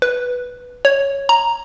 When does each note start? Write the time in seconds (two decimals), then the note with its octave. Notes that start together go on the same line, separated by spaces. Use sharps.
0.02 B4
0.85 C#5
1.29 A#5